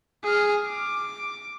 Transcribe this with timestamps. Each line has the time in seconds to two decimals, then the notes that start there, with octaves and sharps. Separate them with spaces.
0.23 G#4 F6
0.67 D6